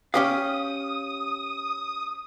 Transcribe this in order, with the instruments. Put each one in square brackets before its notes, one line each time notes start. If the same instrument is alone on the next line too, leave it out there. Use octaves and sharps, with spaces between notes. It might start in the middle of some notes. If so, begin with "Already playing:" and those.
[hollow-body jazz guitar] C#4 G4 F5 [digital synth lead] D#6